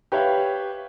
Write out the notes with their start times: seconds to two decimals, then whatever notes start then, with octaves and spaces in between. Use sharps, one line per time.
0.12 G4 B4 C#5 E5 F5 G5